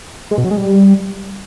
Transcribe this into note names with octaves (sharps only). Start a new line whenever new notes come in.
G#3
B2
F#3
G#3
G3